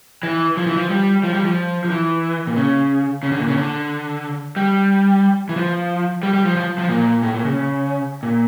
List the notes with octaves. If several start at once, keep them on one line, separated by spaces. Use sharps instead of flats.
E3
F3
E3
F3
G3
F3
G3
F3
F3
E3
A#2
C#3
C#3
D3
A#2
C#3
D3
G3
E3
F3
G3
G3
F3
F3
F3
A#2
A2
A#2
C#3
A#2